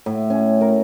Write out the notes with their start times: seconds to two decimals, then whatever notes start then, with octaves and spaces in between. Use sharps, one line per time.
0.06 A2
0.30 C#4
0.61 A#4